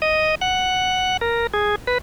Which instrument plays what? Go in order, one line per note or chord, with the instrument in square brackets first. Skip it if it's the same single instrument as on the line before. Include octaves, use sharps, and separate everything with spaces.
[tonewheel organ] D#5
F#5
A#4
G#4
B4